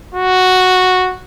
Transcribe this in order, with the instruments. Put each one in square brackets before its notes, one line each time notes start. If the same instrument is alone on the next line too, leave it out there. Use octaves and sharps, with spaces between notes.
[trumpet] F#4